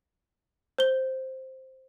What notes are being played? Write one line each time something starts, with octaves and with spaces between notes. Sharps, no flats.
C5 G7